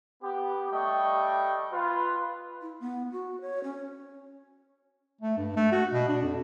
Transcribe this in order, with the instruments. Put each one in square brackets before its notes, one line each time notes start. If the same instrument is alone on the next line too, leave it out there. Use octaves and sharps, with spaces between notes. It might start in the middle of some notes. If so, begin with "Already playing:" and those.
[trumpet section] B3 G4
G3 A3 D#5 G5 C#6
F4 B4
[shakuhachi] E4
B3
F#4
C#5
C#4
[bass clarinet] A3
G2
A3
F#4
B2
D4
F2